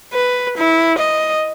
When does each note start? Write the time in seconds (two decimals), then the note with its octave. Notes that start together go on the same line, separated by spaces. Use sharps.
0.14 B4
0.58 E4
0.99 D#5